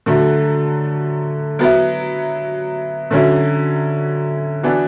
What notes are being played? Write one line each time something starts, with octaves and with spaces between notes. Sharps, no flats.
D3 F#3 A3
F#3 B3 E4
D3 F#3 C#4 E4
E3 B3 D4 F#4